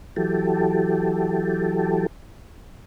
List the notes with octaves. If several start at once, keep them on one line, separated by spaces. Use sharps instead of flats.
E3 F#3 G4 A4